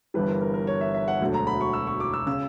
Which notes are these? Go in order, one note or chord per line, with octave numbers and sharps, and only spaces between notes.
G1 G2 E3 G3 B4
A#4
A#4
A#4
C#5
E5
E5
F#5
E1 D2 D3 F#3
A#5
B5
C#6
E6
C#6
D6
E6
C#3 E6